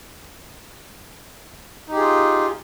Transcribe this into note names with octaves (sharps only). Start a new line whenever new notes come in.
D#4 F4 G4 G#4